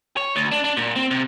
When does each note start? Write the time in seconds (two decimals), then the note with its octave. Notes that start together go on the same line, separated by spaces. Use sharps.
0.17 C#5
0.36 D2
0.52 D4
0.64 D4
0.77 A#2
0.96 C4
1.11 C3